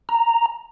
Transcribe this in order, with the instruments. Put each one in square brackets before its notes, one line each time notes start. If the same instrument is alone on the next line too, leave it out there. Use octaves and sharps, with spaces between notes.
[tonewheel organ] A#5